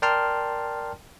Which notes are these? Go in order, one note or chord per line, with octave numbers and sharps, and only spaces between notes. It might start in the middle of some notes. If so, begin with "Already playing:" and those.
A#4 D5 G5 A5 C6 F6